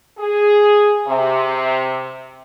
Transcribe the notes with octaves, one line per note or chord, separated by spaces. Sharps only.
G#4
C3